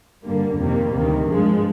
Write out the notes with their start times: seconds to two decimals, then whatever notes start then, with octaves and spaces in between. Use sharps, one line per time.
0.24 G2 D3 G3 A#3
0.58 F2 C3 D#3 G3 A#3
0.93 D2 C3 D#3 G3
1.27 G2 F3 G#3